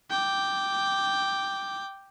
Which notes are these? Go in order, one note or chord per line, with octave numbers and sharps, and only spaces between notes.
G5 D6